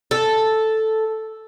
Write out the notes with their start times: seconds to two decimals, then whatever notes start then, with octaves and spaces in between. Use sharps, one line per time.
0.11 A4